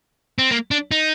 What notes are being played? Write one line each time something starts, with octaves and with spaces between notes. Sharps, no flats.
C4
A#3
D4
D#4